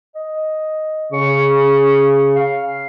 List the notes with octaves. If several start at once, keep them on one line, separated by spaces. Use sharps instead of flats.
D#5
C#3 C#6
F5